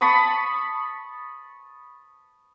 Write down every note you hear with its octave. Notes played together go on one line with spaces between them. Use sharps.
A5 B5 C#6 D#6